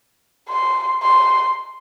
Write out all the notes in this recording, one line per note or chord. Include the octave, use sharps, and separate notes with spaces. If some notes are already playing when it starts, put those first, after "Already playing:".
C6
C6